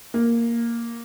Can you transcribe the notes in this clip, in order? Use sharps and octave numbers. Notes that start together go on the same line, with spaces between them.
A#3